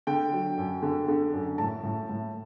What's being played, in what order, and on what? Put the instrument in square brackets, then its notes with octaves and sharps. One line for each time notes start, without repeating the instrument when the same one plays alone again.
[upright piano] D3 G5
F#3
F#2
D3
D3
F#2
A2 A5
A2
A2